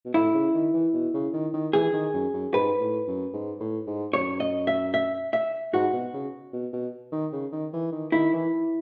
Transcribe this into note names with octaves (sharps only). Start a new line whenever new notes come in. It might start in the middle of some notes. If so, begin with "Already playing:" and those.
B2
A2 E4
C#3
D#3
E3
B2
C#3
D#3
D#3
E3 G#4
D#3
F#2
F#2
G#2 B4
A2
F#2
G#2
A2
G#2
F#2 C#5
D#5
E5
E5
E5
G#2 F#4
B2
C#3
B2
B2
D#3
C#3
D#3
E3
D#3
D#3 E4
E3